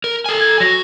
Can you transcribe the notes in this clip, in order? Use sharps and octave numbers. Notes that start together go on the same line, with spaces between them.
A#4
A4 G#5
G#6
F#3 F#4 A#6